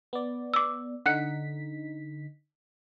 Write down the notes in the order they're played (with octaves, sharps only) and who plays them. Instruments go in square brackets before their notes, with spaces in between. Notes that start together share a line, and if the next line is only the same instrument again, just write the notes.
[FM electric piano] B3 D5
[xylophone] D6 E6
[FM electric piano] D3 D#4 B6 [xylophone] F#5 F#6 C#7